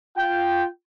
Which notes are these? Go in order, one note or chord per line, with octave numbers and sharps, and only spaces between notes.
F4 G5